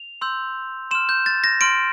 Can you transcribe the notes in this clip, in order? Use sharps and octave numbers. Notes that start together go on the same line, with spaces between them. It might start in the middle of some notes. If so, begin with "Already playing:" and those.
Already playing: F7
C6 E6 G6
C6 F6 E7
G6
A6
A#6
C6 F6 D7